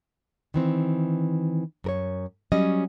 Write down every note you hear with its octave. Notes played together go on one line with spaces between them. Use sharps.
D#3 E3 C4
F#2 A#4 C#5
F#3 G3 C#4 D#5